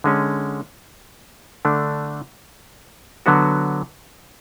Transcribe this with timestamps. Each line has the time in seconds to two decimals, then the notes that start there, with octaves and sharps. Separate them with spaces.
0.04 D3 G#3 C#4
1.65 D3 A3 D4
3.26 D3 F#3 B3 F#4